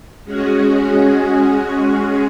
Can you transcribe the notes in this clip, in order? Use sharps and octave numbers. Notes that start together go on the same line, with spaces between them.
G#3 C#4 F#4 G#4